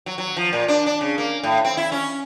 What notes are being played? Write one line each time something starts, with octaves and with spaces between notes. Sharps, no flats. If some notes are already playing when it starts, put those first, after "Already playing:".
F#3
F#3
F3
A#2
D4
D4
C#3
A#3
A2
C4
E4
C#4